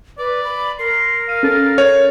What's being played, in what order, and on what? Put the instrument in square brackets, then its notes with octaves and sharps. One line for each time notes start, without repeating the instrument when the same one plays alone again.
[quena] B4 [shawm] D5
[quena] B5
[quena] A#4 [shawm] C6
[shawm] F5 [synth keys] D#7
[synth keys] C#4 A4 A6
[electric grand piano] C#5